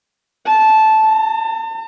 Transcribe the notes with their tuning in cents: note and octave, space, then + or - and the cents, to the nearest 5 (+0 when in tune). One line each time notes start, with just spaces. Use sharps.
A5 -10
A5 +45